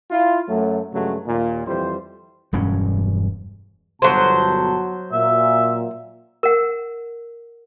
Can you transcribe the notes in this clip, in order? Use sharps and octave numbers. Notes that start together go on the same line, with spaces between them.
E4 F4
F#2 F#3 A3
G2 C#3 F#3 G#3 A3
D#2 A#2
F2 E3 G3 C5
E1 G2 F#3 C#4
G1 B2 F#3 C5 A5
A#2 E5
A#4 F#5